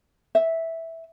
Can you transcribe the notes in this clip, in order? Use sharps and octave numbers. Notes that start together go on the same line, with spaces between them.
E5